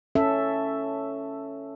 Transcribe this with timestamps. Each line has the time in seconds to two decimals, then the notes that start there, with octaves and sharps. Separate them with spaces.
0.15 C#4 A4 E5